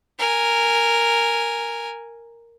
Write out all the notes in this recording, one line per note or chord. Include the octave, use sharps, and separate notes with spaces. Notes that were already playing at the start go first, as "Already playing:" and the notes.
A#4 G#5